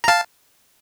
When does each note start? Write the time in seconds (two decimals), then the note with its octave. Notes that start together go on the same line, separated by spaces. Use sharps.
0.04 A#5
0.08 F5 A5